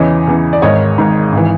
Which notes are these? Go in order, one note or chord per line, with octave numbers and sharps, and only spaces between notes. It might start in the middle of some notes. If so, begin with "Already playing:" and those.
Already playing: E2 C#3 E3 C#5 D#5
E2 C#3 E3
D5
G#1 G#2 D#3 C#5 D#5
G#1 G#2 D#3
G#1
E3